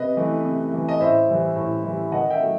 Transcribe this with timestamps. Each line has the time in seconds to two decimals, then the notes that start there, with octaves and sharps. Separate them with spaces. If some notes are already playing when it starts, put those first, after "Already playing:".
Already playing: C3 B4 D#5
0.17 E3 A3
0.45 C3
0.73 E3 A3
0.89 D#5
1.00 A2 C5 E5
1.29 E3 G3
1.56 A2
1.84 E3 G3
2.12 D#3 D#5 F#5
2.30 E5 G5
2.40 F#3 A3